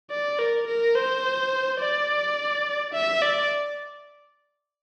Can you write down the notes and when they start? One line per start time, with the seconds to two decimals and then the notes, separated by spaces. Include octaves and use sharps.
0.10 D5
0.39 A#4
0.67 A#4
0.95 C5
1.80 D5
2.93 E5
3.22 D5